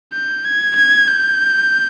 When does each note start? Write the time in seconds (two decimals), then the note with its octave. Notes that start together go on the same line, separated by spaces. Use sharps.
0.13 G6
0.45 G#6
0.76 G#6
1.08 G6